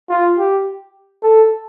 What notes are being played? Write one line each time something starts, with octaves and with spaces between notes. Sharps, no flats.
F4
G4
A4